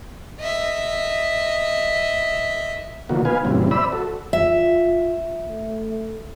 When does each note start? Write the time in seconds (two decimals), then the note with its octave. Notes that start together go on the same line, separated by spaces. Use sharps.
0.40 D#5 E5
3.09 B2 D3 D#3 F3 A#3 F#4
3.25 B3 D#4 B4 F5 G#5
3.45 F#2 A#2 C#3 E3 G3 C4
3.71 C5 D5 E5 B5 E6
3.92 F#4 A4
4.33 F4 E5
5.46 A3